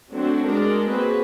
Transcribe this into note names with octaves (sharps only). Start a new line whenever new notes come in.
F#3 A3 C4 D4 F#4
G#3 D4 A#4 D5
A#3 C4 F#4 G#4 B4